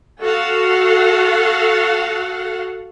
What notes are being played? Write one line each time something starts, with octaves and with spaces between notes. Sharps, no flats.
F#4 A4 F5 F#5